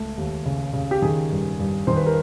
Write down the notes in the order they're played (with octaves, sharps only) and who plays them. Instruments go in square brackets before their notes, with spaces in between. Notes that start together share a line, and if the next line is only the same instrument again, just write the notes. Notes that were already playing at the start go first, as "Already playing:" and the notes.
Already playing: [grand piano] C#2 A3
D#2
C#3
C#3
G4
D#3 G#4
G2
G2
D#3 C5
B4
A#4